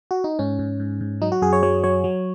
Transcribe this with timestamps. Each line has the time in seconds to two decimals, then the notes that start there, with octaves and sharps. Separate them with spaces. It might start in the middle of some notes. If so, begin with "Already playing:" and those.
0.11 F#4
0.24 D#4
0.39 G#2 C#4
0.59 G#2
0.80 G#2
1.01 G#2
1.21 F#3 D#4
1.32 F#4
1.42 F#2 G#4
1.53 C#5
1.63 F#3 C#5
1.84 F#3 C#5
2.04 F#3